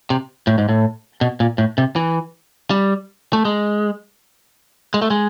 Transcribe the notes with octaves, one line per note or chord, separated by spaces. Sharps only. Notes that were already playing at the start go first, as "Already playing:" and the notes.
C3
A2
G#2
A2
B2
A#2
A2
C3
E3
G3
A3
G#3
G#3
A3
G#3